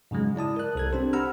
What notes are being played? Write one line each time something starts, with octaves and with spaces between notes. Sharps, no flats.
G#2 C#3 F#3 G#3
E4 D5 A5 D#6
A#4 F#6
C2 A4 G#6
C4 D4 G4 C5
F#5 A#5 B5 E6 F6